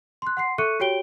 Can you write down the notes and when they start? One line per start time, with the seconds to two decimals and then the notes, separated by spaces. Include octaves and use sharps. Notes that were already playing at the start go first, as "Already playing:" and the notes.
0.22 C6 F#6
0.37 F#5 C6 C7
0.58 A4 E5 C#6 F#6 C#7 D#7
0.80 F#4 G4 C#5 G5 D7 G7